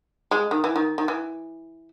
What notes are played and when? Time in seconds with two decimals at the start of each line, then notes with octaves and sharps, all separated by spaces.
0.31 G#3
0.51 D#3
0.64 E3
0.76 D#3
0.98 D#3
1.08 E3